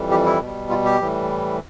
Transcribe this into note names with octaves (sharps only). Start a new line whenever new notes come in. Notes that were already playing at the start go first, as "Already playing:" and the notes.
Already playing: F2 E3 G3
G4
E4
B2 G3
F4
G4
A2 E3 G3